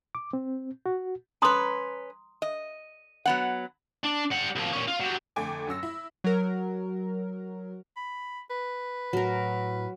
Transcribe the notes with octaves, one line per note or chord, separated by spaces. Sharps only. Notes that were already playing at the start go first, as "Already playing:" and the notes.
D6
C4
F#4
C#4 B4 A#5 C6 D#6
D#5
F#3 B3 F#5
D4
G3 F#5
C2 F3
A#2 C#4
F4
F#3 G3
F2 D3 A3 G5 G#5 D6
F#2 C#4 E6 A#6
E4
F#3 A#4
B5
B4
A2 F#3 A#4